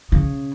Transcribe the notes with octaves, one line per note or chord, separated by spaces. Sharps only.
C#3